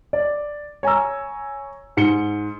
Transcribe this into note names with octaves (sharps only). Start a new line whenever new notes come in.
D5
C#5 G#5 A#5 E6
G#2 C#7 G7